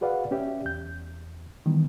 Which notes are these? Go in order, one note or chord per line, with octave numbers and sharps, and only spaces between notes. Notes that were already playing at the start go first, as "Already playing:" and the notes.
F#4 G#4 B4 D5 F5 F#5
C#4 G4 D5 E5
E2 G6
D#3 E3 G3 B3